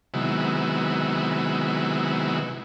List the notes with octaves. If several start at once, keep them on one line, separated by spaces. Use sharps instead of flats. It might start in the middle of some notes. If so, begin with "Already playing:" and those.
C3 D#3 F#3 G#3 B3 E4